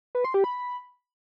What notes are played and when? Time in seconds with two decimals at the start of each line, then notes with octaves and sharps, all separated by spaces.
0.15 B4
0.24 C6
0.34 G4
0.44 B5